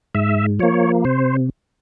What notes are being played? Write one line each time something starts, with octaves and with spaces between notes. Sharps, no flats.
G#2 E5
F3 A#3 C#5
C3 C5